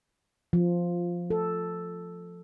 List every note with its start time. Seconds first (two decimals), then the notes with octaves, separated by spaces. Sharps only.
0.53 F3
1.30 A4